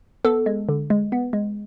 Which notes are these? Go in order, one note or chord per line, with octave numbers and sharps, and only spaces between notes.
B3 A4
G#3
D3
G#3
B3
G#3